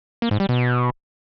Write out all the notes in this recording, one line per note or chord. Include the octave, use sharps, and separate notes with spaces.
A#3
G#2
G3
B2